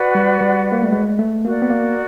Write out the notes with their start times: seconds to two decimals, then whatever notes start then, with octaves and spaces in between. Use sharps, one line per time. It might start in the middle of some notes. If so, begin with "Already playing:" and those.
Already playing: F#4 B4 D5 F#5
0.15 G3
0.41 G3
0.72 A#3
0.83 A3
0.93 G#3
1.19 A3
1.45 A#3 F#4 A#4 D5
1.62 B3
1.70 A#3